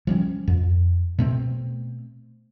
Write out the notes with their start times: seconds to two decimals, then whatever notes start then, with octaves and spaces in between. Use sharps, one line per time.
0.07 F3 G3 C#4
0.48 F2
1.19 B2 A3 C4